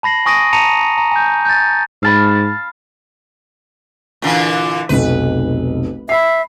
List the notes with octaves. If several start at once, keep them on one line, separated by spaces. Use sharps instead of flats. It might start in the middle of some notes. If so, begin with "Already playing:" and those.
A5 B5 A#6 C7 F#7
G#5 C#6 D#6 A#6 D7 D#7
A5 A#5 C#7 D#7 F7
A#5
G#5 G6
G6 A6
G#2 F5 A5 B5
A#2 D3 E3
F1 B1 B4
E5 B5 C7